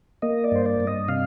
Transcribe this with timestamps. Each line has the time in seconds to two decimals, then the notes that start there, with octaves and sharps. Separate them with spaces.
0.22 A#3 D#5
0.44 D5
0.52 G2 C5
0.66 D5
0.80 G2
0.87 D#5
1.08 C3 F5